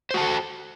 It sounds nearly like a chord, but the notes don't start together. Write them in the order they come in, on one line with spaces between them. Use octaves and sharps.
C5 F#4 A5 A4